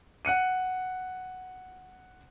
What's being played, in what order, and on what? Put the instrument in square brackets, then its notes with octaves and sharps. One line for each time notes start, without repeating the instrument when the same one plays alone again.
[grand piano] F#5 F#6 C#7 D#7